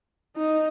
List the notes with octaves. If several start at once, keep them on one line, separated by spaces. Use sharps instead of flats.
D#4